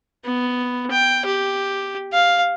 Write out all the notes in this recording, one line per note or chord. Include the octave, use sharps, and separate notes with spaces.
B3
G5
G4
F5